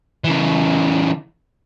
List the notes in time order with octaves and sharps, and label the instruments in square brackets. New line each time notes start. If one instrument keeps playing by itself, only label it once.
[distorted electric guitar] C#3 E3